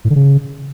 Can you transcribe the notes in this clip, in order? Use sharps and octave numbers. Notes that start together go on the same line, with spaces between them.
A2
D3
C#3